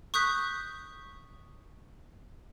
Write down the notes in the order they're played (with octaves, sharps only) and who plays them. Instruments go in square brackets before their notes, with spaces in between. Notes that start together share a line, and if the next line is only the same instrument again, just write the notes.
[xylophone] C#6 D#6 F#6 G6 B6